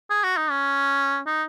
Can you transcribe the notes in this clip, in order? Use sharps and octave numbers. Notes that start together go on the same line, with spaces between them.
G#4
F#4
D#4
C#4
D#4